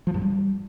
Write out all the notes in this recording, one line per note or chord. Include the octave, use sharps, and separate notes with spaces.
F3
G2
G3